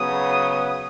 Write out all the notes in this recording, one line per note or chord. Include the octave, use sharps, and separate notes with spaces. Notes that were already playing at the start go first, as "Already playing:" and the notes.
Already playing: C#3 F#3 B3 D#6